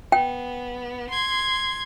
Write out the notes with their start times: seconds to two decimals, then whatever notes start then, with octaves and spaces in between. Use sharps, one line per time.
0.12 B3 G5
1.10 C6 G#6